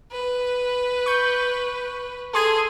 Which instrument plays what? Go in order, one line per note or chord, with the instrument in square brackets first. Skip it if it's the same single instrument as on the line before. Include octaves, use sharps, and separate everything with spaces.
[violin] B4
[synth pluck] C#6 G6
[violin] G#4 D#6 [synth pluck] A4 C6 G#6